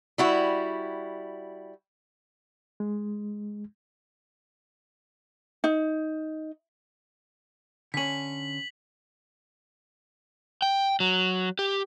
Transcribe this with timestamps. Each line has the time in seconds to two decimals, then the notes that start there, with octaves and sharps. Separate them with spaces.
0.18 G3 E4 F#4
2.80 G#3
5.64 D#4
7.94 D3 C#4 B6 F#7
10.62 G5
11.00 F#3
11.59 G4